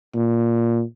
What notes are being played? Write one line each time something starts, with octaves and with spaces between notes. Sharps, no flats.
A#2